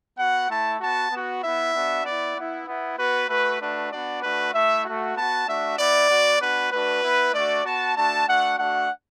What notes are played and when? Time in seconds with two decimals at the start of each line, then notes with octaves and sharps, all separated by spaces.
0.18 B3 F#4 F#5
0.49 A3 E4 A5
0.80 B3 F#4 A5
1.12 B3 F#4
1.42 B3 E4 E5
1.74 B3 D4 F#4
2.04 B3 E4 D5
2.36 B3 E4
2.66 B3 E4
2.97 B3 F#4 B4
3.29 A3 F#4 B4
3.61 A3 D4 F#4 B4
3.92 B3 D4 F#4 D5
4.22 A3 D4 F#4 B4
4.53 A3 E4 E5
4.84 A3 F#4
5.15 B3 F#4 A5
5.47 A3 D4 F#4 E5
5.77 B3 E4 D5
6.09 B3 F#4
6.40 B3 D4 F#4 B4
6.71 A3 D4 F#4 B4
7.03 B3 E4
7.33 A3 D4 F#4 D5
7.65 B3 F#4 A5
7.96 A3 D4 F#4 A5
8.27 A3 D4 F#4 F#5
8.57 A3 D4 F#4 F#5